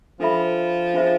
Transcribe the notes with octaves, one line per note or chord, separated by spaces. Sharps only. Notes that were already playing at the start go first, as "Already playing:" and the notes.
F3 D4 A4 E5 B5
D4 F4 G#4 C5 E5